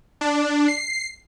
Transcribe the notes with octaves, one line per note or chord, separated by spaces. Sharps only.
D4
C7